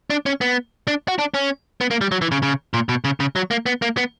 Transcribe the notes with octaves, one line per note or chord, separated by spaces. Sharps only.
D4
C#4
B3
D4
F#4
D4
C#4
B3
A#3
G3
F#3
E3
C#3
C#3
A#2
B2
C#3
C#3
F#3
A#3
B3
A#3
B3